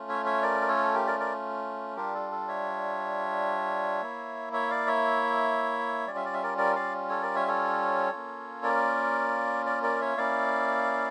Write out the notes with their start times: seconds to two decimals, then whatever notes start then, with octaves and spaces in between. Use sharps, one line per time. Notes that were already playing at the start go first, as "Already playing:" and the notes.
Already playing: A3 C#4 F4
0.09 C#5 E5
0.25 C#5 E5
0.42 A#4 D5
0.61 A#4
0.68 A4 C#5
0.94 G4 A#4
1.07 A#4 D5
1.19 A#4 D5
1.96 G3 D4 F4 G4 A#4
2.15 A4
2.32 A4
2.48 C#5 E5
4.02 A#3 E4
4.53 C#5 E5
4.70 D5 F5
4.87 C#5 E5
6.07 G3 C#4 F4 D5
6.16 E5
6.25 D5
6.34 E5
6.43 A#4 D5
6.58 A#4 D5
6.76 D5 F5
7.09 A4 C#5
7.22 A#4 D5
7.35 C#5 E5
7.48 A4 C#5
8.12 A#3 C#4 F4
8.63 A#4 D5
9.66 A#4 D5
9.83 A#4 D5
10.01 C#5 E5
10.17 A#3 C#4 E4 D5 F5